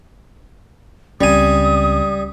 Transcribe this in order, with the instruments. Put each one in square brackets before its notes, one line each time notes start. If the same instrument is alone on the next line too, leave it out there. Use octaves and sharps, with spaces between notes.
[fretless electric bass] C#2 C4 C#4 [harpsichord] G3 G#5 [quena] D#6